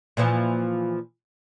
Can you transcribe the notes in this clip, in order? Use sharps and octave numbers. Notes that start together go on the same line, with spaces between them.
A#2 E3 F3